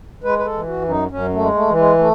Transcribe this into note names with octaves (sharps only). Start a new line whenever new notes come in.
G#3 B4
B4
A4
E3
F#4
F#2
D#4
F#2 C#4
A3
G#3
A3
E3
G#3
A3